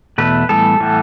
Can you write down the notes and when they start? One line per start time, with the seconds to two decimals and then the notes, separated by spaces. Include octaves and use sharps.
0.18 E2 B2 A3 B4
0.49 A2 E3 G3 B3 A4
0.80 A2 E3 G3 B3